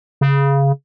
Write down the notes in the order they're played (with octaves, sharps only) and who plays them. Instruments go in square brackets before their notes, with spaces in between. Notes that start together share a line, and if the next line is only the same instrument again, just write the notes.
[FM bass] C#3